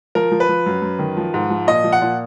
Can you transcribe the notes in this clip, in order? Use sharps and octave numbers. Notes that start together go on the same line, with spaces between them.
F3 A#4
F3
B4
F3
F#2
F#2
D#3
F3
G#2
F3
A#2 D#5
F3
F#5
A#2